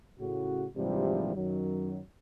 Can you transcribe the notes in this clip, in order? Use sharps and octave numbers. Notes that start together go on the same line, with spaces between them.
A2 C#3 F#4
A#1 G#2 C3 E3 F3 G3
F#2 D#3 F#3